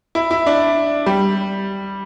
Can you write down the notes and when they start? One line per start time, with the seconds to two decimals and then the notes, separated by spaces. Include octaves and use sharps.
0.15 E4
0.31 E4
0.46 D4
1.06 G3